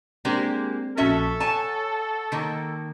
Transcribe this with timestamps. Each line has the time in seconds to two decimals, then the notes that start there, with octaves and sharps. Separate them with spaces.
0.25 G#3 A#3 C4 D4 G4
0.97 A#1 C#4 F#4 A4 E5 B6
1.40 C#5 F#5 G#5 A5 C#6
2.32 D#3 A#3